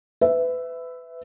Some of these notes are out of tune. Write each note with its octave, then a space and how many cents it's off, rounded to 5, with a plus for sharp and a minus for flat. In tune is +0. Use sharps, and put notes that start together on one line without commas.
B4 +25 E5 +0